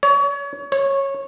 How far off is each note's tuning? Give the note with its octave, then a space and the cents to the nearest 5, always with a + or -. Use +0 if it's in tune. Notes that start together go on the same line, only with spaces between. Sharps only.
C#5 +30
C#5 -15